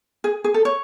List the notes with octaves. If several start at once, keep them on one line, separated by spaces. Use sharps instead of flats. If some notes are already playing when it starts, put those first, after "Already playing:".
G#4
G#4
A4
C#5